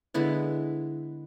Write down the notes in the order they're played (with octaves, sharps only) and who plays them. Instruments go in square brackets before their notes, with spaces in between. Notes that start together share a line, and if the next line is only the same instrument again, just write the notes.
[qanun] D3 G#3 B3 E4